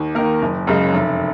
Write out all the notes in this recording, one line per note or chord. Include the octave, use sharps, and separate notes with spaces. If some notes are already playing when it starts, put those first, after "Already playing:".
Already playing: D#2
D#3 A#3 A#4
F#1
F#2 C#3 G#3
F1